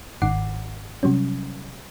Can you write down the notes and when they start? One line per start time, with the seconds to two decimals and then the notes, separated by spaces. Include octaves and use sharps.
0.22 G1 G#2 D#3 F#5 D6 C7
1.03 C3 F#3 G3 C#4